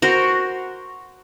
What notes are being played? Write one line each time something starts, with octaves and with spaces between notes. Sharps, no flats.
F#4 A#4 C5